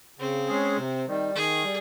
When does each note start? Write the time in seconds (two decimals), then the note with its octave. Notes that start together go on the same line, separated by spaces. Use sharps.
0.19 C#3 C4
0.48 G#3 C#4 G#4
0.77 C3
1.07 D#3 G3
1.35 D#3 G#4
1.64 G3